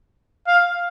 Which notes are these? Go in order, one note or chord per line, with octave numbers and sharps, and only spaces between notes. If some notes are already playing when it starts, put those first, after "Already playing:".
F5